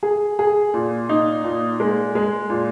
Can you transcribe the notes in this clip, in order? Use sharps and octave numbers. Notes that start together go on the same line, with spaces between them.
G#4
G#4
A#2
D#4
A#2
G#3
G#3
A#2